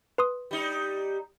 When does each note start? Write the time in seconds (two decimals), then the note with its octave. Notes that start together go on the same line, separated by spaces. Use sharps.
0.18 B4 C6 D#6
0.51 G3 D#4